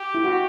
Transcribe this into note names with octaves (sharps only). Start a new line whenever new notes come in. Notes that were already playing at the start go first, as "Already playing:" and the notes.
Already playing: G4
E4
F#4